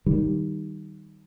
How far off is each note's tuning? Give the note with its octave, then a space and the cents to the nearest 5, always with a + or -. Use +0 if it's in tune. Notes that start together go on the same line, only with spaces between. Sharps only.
D#3 +0 G3 -5